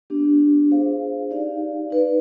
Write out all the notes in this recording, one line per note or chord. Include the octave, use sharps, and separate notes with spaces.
B3 D4 G4
F4 G#4 C5 F5
D#4 G4 D5 F5
D#4 B4 D5